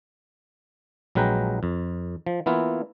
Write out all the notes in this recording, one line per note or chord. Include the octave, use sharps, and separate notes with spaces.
A#1 F#3 G#3 B4 G5 A#5
F2
F3
E3 A#3 B3 E4 F4